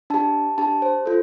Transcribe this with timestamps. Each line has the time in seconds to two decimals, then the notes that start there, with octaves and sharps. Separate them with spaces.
0.10 D4 G4 A5
0.58 D4 G4 A5
0.82 C5
1.06 F4 A4